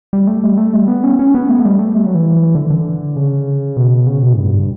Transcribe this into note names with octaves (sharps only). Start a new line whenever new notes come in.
G3
A3
G3
A3
G3
B3
C#4
C#4
B3
A3
A3
G3
A3
G3
F#3
E3
D3
D3
C#3
B2
C#3
B2
A2
G2